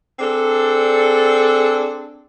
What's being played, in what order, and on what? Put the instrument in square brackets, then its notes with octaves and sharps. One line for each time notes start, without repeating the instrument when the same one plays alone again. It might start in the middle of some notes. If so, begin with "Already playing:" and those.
[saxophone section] C4 D4 G#4 A4